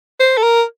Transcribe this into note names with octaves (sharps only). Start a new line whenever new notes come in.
C5
A4
A#4